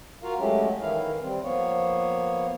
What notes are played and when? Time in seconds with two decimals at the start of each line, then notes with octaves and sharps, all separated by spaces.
0.23 F4 F#4 A#4 F5
0.38 F#3 G#3 A3 C#4 G4
0.81 D#3 E3 E4 F5
1.22 G3 C4
1.43 F3 A#3 B3 C#5